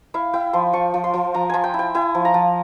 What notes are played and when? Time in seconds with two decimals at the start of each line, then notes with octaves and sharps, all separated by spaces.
0.14 E4 F5
0.33 E4 G5
0.53 F3 C6
0.73 F3 C#6
0.94 F3
1.04 C6
1.13 F3
1.34 F3 A#5
1.49 F3 G#5
1.64 G5
1.74 E4
1.79 G5
1.95 E4 G#5
2.15 F3
2.25 A#5
2.34 F3